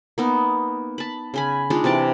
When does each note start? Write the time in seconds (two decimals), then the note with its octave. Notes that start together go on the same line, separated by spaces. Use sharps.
0.18 A#3 B3 D#4
0.98 A5 B5
1.34 C#3 G#5 B5
1.70 G#3 D4 D#4 F4
1.84 C3 E3 D5 A5